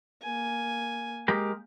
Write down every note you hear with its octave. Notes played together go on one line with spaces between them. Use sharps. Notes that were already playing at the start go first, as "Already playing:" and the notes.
A#3 G#5
G#3 G4 A#4